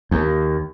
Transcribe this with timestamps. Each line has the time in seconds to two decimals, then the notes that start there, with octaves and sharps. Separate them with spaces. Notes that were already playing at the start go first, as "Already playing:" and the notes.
0.11 D#2